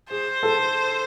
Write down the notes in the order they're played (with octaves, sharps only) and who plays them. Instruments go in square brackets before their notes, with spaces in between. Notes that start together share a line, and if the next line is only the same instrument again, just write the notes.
[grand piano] G#4 [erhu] C5
[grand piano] A4